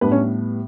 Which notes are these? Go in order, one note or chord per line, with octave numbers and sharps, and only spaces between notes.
A2 G3 B3 D4 B4
C#4 C#5